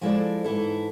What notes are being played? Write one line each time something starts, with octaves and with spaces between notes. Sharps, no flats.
F3 G#3 E4 A4 C5 D5
G#2 E3 E4 A4